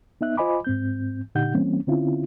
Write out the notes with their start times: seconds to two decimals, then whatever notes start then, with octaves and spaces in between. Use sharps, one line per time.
0.21 B3 D#4 E5 F#6
0.37 F4 C5 D#5 G#5 B5 D6
0.65 G#2 C4 G6
1.35 A#2 D3 D#4 G4 F#5 G6
1.55 E3 G3 A#3 C4 C#4
1.87 D3 C4 C#4 E4 F4